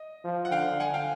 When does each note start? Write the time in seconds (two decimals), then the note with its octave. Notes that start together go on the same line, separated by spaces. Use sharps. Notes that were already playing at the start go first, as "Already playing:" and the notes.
Already playing: D#5
0.24 F3
0.45 F#5
0.51 D3 F5 G5
0.80 F#5 G#5
0.94 F5 G5